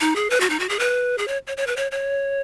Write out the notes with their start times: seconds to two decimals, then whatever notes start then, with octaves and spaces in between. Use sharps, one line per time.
0.01 D#4
0.16 G#4
0.30 B4
0.40 F#4
0.50 D#4
0.60 F#4
0.69 G#4
0.79 B4
1.18 G#4
1.28 C#5
1.47 C#5
1.57 C#5
1.67 B4
1.76 C#5
1.92 C#5